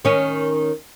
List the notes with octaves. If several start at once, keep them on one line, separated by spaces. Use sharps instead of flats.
D#3 C#4